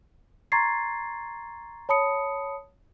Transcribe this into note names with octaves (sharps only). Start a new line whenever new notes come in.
A#5 C6 C#6 G#6 A6 C7
C#5 A5 B5 D#6 C#7